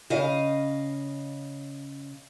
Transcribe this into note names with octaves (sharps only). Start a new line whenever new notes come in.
C#3 D#5 F5